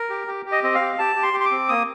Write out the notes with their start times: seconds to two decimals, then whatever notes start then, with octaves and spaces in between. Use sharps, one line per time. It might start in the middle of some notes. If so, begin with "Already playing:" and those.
Already playing: A#4
0.10 G4
0.27 G4
0.46 G4
0.52 D#5
0.63 C4 D#5
0.75 F5
0.81 G4
0.99 G4 A5
1.16 G4
1.23 C6
1.33 G4
1.40 C6
1.45 D6
1.51 C4
1.69 A#3 D#6